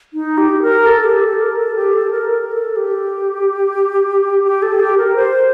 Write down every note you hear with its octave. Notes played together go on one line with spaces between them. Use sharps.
D#4
G4
A#4
A4
G4
A4
A#4
A4
G4
A4
A#4
A#4
A4
G4
G4
A4
G4
A#4
C5